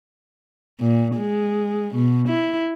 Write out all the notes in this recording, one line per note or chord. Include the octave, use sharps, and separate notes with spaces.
A#2
G#3
B2
E4